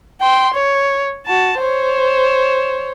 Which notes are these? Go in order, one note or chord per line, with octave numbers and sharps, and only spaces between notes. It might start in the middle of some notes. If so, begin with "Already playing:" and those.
G5 C6
C#5
F#4 A5
C5 C#5